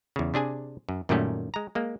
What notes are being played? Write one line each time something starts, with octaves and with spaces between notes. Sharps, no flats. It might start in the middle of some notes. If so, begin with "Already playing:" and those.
E2 C#3
C3 D4 G#4 G#5
F#2
F#2 A#2 D#3 G3 A3 C#4
G#3 A#5
G#3 A#3